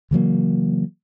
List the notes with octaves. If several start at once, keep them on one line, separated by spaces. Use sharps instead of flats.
C#3 E3 F#3 A#3